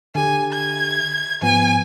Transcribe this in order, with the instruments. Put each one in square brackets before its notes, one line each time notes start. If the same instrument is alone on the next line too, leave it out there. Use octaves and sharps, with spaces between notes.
[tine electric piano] D3 G4 [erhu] G#5
[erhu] G#6
[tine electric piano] G#2 F3 B3 [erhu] G#5